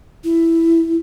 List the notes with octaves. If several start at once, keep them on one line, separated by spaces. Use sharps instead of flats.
E4